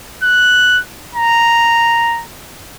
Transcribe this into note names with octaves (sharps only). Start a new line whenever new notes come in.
F#6
A#5